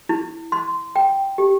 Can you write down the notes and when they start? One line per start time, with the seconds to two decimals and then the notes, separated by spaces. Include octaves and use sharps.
0.09 E4
0.52 C6
0.96 G5
1.38 G4